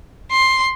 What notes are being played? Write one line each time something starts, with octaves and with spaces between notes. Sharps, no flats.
C6